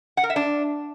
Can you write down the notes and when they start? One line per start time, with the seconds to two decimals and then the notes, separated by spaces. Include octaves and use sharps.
0.17 F#5
0.24 A#4
0.30 E5
0.36 D4